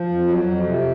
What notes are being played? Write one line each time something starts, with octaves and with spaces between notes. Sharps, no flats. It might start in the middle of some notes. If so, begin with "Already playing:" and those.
Already playing: F3
F2
F#3
F2
C3